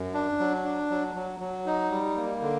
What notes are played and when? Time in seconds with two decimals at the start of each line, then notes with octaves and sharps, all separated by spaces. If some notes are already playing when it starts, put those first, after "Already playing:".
Already playing: F#2
0.14 D4
0.40 F#3
0.65 D4
0.90 F#3
1.15 F#3
1.40 F#3
1.66 D#4
1.91 G3
2.16 A#3
2.42 D3